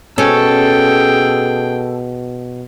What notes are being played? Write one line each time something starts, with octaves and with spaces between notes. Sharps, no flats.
B2 C#4 G#4 A4 G5